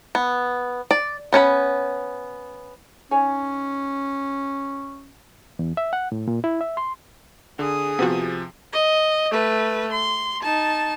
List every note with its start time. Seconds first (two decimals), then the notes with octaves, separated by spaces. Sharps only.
0.15 B3
0.91 D5
1.32 B3 C#4 C#5 B5
3.11 C#4 D#4 C#5 G#5
5.59 E2
5.77 E5
5.93 F#5
6.12 A2
6.28 A#2
6.44 E4
6.61 E5
6.77 C6
7.59 D3 G#4 D#6
7.99 C3 F3 B3 C4 F#4
8.73 D#5
9.31 A3 B4
9.91 C6
10.42 D#4 A5